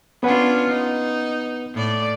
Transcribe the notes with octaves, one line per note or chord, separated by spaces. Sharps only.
B3 C#4 D4 F4 B4 F#5
D#4
A2 D5